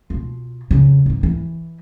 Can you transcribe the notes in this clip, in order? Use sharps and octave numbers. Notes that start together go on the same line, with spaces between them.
B2 F4
F2 C#3
G#2 E3
E3